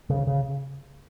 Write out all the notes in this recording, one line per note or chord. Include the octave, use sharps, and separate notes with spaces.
C#3
C#3